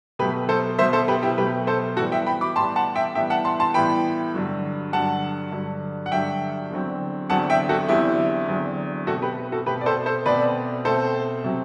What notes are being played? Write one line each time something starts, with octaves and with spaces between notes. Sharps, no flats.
B2 F#3 A3 G4 B4
A4 C5
B2 F#3 A3 C5 E5
A4 C5
G4 B4
E4 G4
B2 F#3 A3 G4 B4
A4 C5
A2 E3 G3 B3 F#4 A4
E5 G5
G5 B5
B5 D6
A2 E3 G3 B3 A5 C6
F#5 A5
E5 G5
A2 E3 G3 B3 E5 G5
F#5 A5
A5 C6
A5 C6
A2 E3 G3 B3 G5 B5
G2 D3 F#3
G2 D3 F#3 F#5 A5
G2 D3 F#3
F#5
G2 D3 F#3 E5 G5
E2 D3 F#3 C4
E2 D3 F#3 C4 F#5 A5
E5 G5
F#4 A4
E2 D3 F#3 C4 E4 G4
E2 D3 F#3 C4
B2 A3 C4 F#4 A4
G4 B4
F#4 A4
B2 A3 C4 G4 B4
D5
A4 C5
A4 C5
B2 A3 C4 B4 D5
B2 A3 C4 A4 C5
C3 F#3 C4